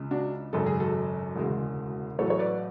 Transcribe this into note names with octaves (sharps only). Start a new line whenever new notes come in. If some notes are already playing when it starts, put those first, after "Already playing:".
Already playing: C#2 C#3 G#3
D4 F#4
G#1 F#2 C#3 A4
G#4
F#4 A4
E1 D2 C#3 G#3
A1 A2 F#3 A4 C#5
C#5
B4 D5